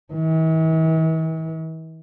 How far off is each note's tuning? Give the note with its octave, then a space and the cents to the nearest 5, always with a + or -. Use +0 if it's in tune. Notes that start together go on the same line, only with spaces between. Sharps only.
E3 -45